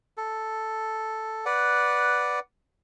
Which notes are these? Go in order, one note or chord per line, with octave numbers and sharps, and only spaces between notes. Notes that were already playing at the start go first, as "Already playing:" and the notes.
A4
B4 D5 F#5